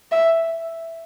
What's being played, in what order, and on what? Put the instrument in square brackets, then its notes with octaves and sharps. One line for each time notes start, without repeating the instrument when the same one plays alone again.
[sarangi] E5